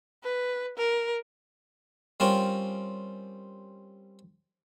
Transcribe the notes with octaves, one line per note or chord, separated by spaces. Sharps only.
B4
A#4
G3 C4 C#4 F4 A#4